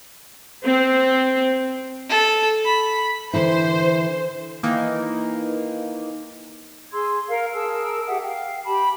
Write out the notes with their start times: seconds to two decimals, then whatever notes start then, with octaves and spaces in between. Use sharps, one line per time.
0.65 C4
2.09 A4
2.65 B5
3.33 D3 E3 E4 C5
4.63 D#3 E3 A#3 D#4
6.92 G#4 C6 E6 G#6
7.29 A#4 F5
7.54 G#4 A#4 A5 E6
8.07 G4 G#4 E5 F#5
8.24 F5 G5
8.66 G4 A5 B5